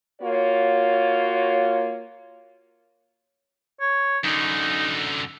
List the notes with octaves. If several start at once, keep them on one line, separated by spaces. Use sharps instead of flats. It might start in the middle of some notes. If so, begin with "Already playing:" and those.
A#3 F4 F#4 C#5
C#5
F#2 D3 D#4